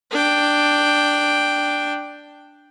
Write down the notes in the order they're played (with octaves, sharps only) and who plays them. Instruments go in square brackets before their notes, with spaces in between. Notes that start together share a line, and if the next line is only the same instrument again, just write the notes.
[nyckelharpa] D4 G5